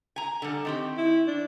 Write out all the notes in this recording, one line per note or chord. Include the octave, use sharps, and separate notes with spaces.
G#5 A#5
D3 G3
D#3 C4 G4
E4
D4